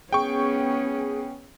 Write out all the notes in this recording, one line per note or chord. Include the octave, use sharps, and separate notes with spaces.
B3 C#4 G#4 G5 C#6